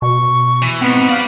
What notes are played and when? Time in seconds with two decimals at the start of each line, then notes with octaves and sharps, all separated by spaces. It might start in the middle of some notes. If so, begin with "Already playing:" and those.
0.02 B2 C#6
0.62 E3
0.81 G#2 B3 C4
1.09 G4 D5 F5